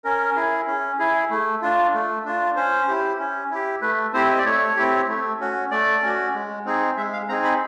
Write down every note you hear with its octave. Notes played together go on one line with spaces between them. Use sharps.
C#4 A#4
E4 G#4
C#4
E4 G#4
A3
D4 F4
A3
D4 F4
C#4 C5
E4 G4
C#4
E4 G4
A3 B4
C4 E4 G4 C5
D#5
D5
A3 C#5
C4 E4 G4
A3
C#4 F#4
A3 D5
C#4 F#4
G#3
C4 D#4 G#4
G#3 E5
F5
C4 D#4 G#4 A#5
B5